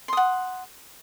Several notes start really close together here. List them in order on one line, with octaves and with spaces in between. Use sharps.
C6 D#6 F#5